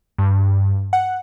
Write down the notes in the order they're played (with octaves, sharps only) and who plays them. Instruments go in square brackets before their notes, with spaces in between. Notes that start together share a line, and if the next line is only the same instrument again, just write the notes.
[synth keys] G2
F#5